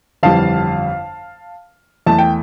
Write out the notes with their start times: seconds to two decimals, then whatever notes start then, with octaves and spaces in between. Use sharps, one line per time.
0.23 G1 F2 E3 G3 F5 A5
2.07 E2 E3 A3 A5
2.19 G5